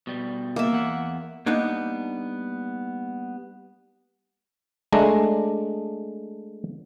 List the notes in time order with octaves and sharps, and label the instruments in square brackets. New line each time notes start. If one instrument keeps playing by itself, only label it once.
[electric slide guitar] B2 G3
[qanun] A#3 E5
[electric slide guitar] E2 F#5
[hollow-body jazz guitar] G3 A#3 B3 D4 D#4
[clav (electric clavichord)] G#3 A3 D4 A#5